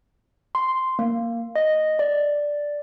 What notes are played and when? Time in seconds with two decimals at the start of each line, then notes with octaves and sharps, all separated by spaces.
0.55 C6
0.99 A#3
1.56 D#5
1.99 D5